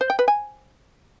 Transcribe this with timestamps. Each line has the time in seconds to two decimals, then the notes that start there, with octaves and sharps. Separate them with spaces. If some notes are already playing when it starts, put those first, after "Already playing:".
0.01 C5
0.10 G5
0.19 B4
0.28 G#5